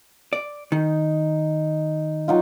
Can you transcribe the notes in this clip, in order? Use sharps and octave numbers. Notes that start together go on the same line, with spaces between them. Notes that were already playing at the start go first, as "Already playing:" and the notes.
D5
D#3 D#4
F#3 D#4 F4